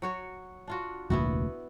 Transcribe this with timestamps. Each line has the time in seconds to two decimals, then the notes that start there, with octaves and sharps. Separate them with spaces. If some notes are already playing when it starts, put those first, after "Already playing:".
0.02 F#3 F#4 C#5
0.68 D4 F4 F#4
1.10 F1 D2 A#2 B3 E4 F#4